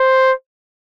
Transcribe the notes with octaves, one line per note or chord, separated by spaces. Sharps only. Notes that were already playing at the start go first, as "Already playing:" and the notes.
Already playing: C5